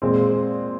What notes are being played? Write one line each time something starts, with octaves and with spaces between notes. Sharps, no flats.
A#2 G#3 C4